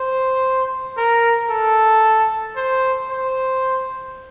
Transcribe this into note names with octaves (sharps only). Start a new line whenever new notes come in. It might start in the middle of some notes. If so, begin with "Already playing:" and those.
Already playing: C5
A#4
A4
C5
C5